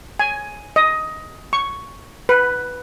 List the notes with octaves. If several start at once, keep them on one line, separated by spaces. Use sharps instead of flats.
G#5
D#5
C#6
B4